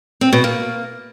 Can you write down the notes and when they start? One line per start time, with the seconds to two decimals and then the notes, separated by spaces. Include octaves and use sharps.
0.21 C4
0.33 B2
0.44 A#3